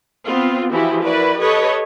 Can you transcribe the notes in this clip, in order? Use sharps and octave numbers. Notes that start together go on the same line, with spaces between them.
B3 C4 F4
E3 F3 E4 F#4 G4
E4 F#4 A#4 B4 D5
G4 A4 B4 C#5 D#5